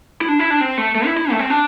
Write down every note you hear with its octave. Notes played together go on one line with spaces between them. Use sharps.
E4
D4
E4
D4
C4
A3
A3
E4
E4
A3
C4
D4